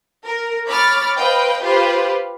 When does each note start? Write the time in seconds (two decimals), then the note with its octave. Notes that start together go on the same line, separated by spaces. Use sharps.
0.24 A#4
0.66 C#5 B5 D6 F6 A6
1.16 B4 C5 D#5 F5 G5
1.62 F4 G4 B4 C5 F5